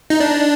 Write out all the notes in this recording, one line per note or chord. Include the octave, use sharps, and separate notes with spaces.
D#4
D4